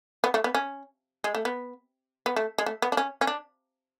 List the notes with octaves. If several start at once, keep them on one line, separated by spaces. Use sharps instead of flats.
B3
A3
B3
C#4
G#3
A3
B3
B3
A3
G#3
A3
B3
D4
C#4
C#4
D4